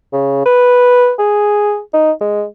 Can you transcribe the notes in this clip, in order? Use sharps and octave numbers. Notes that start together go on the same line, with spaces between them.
C#3
B4
G#4
D#4
G#3